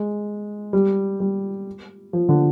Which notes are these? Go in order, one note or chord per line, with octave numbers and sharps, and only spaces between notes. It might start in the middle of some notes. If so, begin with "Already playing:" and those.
Already playing: G#3
G3
G3
F3
D3